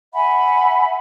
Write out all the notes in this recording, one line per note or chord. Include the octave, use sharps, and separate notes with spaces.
E5 F#5 G#5 B5